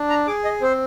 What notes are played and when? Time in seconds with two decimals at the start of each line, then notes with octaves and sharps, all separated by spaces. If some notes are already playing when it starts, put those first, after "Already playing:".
Already playing: D4
0.09 A#5
0.27 G#4 D6
0.44 D#5
0.62 C4 C5